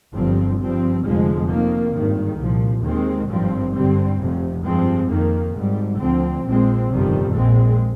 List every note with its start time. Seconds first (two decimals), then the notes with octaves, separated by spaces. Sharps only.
0.13 G1 G2 F3 C4
0.59 G2 F3 C4
1.03 F1 F2 D3 F3 G#3
1.49 F2 D#3 A#3
1.94 G#1 G2 D#3
2.39 C2 A#2 F3
2.84 D#2 D#3 G#3 C4
3.29 G#1 G2 F3 C4
3.74 G2 D3 G3 C4
4.19 F1 F2 C3
4.64 G2 F3 G#3 C4
5.09 F2 D#3 A#3
5.54 G#1 G#2 G3
5.99 D2 D3 F3 C4
6.44 A#1 A#2 F3 G#3 C4
6.89 G1 F2 C3 D#3 G3
7.34 A#1 A#2 G#3 C4